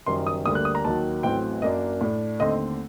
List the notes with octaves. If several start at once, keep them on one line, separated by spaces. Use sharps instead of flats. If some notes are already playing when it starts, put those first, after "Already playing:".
F#1 F#2 D#3 G3 C6
D#6
D2 D3 G3 A#3 D#6
F#6
D#6
A#5
D#2 D#3 F#3 A5
A1 A2 F#3 C4 G5
F#2 F#3 A#3 D4 D#5
A2 A3 D4
D#2 D3 A3 C4 D#5